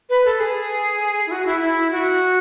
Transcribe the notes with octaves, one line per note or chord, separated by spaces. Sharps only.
B4
A4
G#4
E4
F#4
E4
E4
F#4